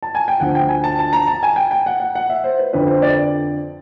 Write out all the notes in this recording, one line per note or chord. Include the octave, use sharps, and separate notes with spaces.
A5
G#5
G5
D2 D3 F3 F#5
G5
G#5
A5
A5
A#5
A5
G#5
G5
G5
F#5
F#5
F#5
E5
C5
B4
F2 D3 F3 B4
C5
D5